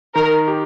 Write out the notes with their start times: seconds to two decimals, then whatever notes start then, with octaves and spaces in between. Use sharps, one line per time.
0.15 D#3 A#4
0.48 G4